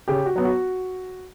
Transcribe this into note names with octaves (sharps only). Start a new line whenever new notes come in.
C#3 G4
F#4
F#3 B3
F#4